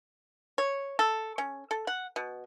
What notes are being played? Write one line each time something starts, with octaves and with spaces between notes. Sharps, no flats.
C#5
A4
C#4
A4
F#5
B2